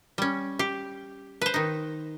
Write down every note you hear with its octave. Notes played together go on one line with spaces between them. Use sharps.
G3 C#4
G4
B4 C5
D#3 D#4